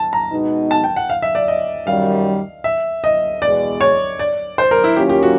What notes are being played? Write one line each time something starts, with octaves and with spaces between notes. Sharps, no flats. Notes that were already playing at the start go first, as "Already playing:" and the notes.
Already playing: A5
A#5
B2 G#3 B3 D#4
A5
G5
F#5
F5
E5
D5
D#5
F#2 D#3 G3 F5
E5
D#5
E2 B2 G#3 D5
C#5
D5
C5
A#4
E4
D#3 F#3 A#3 C#4 F4 G4
G4
F#4